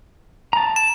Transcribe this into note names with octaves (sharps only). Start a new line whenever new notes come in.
A5 A#5
E7